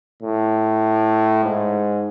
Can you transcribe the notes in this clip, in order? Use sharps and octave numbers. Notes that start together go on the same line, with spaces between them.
A2
G#2